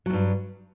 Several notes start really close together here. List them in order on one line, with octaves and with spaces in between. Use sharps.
F#3 E2 G2